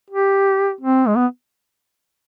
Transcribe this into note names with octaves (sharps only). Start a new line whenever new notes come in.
G4
C4
G#3
B3